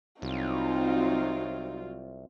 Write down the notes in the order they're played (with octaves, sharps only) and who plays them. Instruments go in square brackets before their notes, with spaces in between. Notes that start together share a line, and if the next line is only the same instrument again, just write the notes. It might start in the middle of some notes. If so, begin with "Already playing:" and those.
[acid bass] C2 [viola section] F#3 C4 F4 [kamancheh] D#4